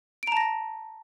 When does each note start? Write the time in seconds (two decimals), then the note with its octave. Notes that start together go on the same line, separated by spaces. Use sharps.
0.23 D7
0.27 A#5
0.32 A5
0.37 A#6